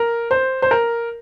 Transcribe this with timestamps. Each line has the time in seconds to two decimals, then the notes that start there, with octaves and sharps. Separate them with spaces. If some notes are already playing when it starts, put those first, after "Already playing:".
Already playing: A#4
0.31 C5
0.62 C5
0.71 A#4